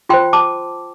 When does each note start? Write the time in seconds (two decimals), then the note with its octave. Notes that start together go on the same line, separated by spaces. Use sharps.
0.09 F4 G5 C6
0.14 C5
0.33 A5 D6